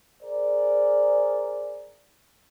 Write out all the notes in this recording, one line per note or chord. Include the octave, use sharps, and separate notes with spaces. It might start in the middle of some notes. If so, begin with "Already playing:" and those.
G#4 A#4 C5 D5